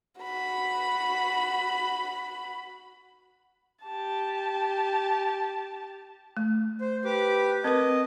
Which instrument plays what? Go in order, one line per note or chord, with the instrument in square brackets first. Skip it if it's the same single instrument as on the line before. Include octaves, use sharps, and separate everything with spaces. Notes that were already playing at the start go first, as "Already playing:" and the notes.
[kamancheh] F#4 B5
G4 A5
[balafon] A3
[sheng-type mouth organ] C5
G4 B4 D6
[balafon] C4 A#4 B4 [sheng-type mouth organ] D#5